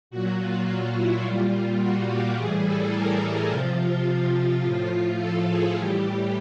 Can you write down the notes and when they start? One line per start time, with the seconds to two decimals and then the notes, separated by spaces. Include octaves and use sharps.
0.11 A#2 F#3 F#4
0.39 F4
0.66 F4
0.96 E4
1.23 A#2 G3 F4
1.79 F#4
2.08 G4
2.36 A2 E3 G3 G#4
2.64 A4
2.93 A#4
3.21 A4
3.50 C3 F3 F4
4.63 A2 F3
5.20 A4
5.48 G#4
5.76 A2 E3 G3 G4